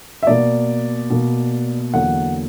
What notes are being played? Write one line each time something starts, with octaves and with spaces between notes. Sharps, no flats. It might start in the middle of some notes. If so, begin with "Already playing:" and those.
E5
B2 A#3 D5
B2 A#3
E2 D3 F#3 A#3 F#5